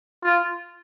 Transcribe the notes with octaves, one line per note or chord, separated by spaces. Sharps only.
F4